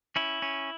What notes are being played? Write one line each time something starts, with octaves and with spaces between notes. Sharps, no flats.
C#4 E4
C#4